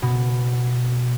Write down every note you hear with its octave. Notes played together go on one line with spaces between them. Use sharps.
B2